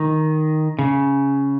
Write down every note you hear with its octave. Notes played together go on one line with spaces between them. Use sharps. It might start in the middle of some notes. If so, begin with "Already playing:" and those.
Already playing: D#3
C#3